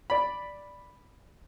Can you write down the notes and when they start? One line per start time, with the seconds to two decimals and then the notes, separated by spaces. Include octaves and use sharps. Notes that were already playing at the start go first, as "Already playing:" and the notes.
0.10 D5 B5